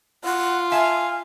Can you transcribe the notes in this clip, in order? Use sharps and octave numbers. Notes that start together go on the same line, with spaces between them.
F4 F#5
E5 F5 G#5 A5